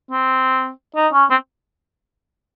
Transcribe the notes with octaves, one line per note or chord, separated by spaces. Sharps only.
C4
D#4
C#4
C4